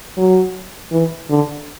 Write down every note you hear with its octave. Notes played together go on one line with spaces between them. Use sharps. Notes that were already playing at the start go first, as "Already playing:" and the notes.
F#3
E3
D3